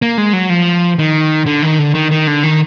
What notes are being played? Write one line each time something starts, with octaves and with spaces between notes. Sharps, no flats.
A#3
G#3
F#3
F3
D#3
D3
D#3
D3
D#3
D#3
D3
D#3